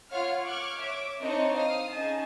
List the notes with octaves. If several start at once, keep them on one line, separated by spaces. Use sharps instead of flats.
F4 C#5 F5 F#5 F6
C#6 D6 F6 F#6 G#6
C#5 E5 D6
C4 D4 D#4 C5 C#5 D#5
F5 D#6
C#4 D#4 G#4 A5